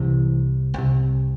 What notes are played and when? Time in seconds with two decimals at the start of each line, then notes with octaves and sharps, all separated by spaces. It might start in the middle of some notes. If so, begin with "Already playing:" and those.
Already playing: C2 C3 E3
0.74 C2 C3